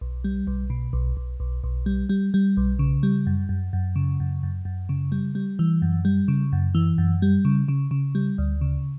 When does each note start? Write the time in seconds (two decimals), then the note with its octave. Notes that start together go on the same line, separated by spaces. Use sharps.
0.01 B1
0.24 G3
0.47 B1
0.70 B2
0.93 B1
1.17 B1
1.40 B1
1.64 B1
1.86 G3
2.09 G3
2.34 G3
2.57 B1
2.79 C#3
3.03 G3
3.27 F#2
3.49 F#2
3.73 F#2
3.96 C#3
4.20 F#2
4.43 F#2
4.65 F#2
4.89 C#3
5.12 G3
5.35 G3
5.59 E3
5.82 F#2
6.05 G3
6.28 C#3
6.52 F#2
6.75 E3
6.98 F#2
7.22 G3
7.45 C#3
7.68 C#3
7.91 C#3
8.15 G3
8.38 D2
8.61 C#3